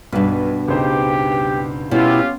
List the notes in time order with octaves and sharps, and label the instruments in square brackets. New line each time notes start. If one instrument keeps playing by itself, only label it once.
[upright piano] B1 [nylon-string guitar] G2 B2
[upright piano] C#2 D#4 C5 [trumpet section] G4
[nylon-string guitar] B2 [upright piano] C#4 [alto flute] E4 [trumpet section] F4 G4